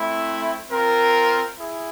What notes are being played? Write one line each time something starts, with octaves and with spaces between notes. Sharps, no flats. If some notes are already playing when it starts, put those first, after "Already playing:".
Already playing: A3 C4 E4
C4 F4 A#4
E4 G#4